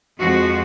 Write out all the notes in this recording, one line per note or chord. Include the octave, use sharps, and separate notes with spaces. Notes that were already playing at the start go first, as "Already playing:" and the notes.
F2 F3 G#3 F#4